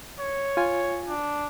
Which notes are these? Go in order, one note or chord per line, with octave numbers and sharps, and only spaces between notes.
C#5
F4 G#5
D4